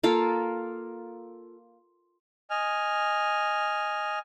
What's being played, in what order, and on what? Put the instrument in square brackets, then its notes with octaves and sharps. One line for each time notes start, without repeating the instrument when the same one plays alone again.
[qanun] A#3 F4 A4
[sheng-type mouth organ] D#5 G#5 F6